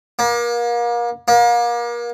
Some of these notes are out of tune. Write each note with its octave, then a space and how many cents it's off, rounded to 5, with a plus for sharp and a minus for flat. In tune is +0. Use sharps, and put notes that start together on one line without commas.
A#3 +35
A#3 +35